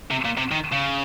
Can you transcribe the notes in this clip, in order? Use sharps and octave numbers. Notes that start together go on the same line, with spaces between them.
C3
A#2
C3
D#3
C#3